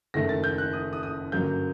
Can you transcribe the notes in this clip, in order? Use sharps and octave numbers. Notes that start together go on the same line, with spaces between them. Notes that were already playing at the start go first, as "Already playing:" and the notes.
F#1 F#2 D#3 A3 A#6
A6
G6
F#6
D#6
D#6
D#6
G1 F#2 F#3 A#3 G6